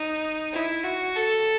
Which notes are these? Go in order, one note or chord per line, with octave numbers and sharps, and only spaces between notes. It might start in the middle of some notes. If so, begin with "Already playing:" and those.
Already playing: D#4
E4
F#4
A4